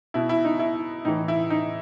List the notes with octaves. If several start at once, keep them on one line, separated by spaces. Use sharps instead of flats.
B2 E4
E4
D#4
E4
A2 E3 D#4
E4
D#4